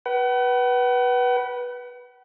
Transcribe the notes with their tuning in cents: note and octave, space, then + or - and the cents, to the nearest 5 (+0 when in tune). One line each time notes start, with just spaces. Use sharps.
B4 -15 F#5 +40